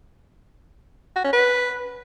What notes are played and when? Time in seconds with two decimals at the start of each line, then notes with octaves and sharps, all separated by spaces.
1.16 F#4
1.24 C#4
1.33 B4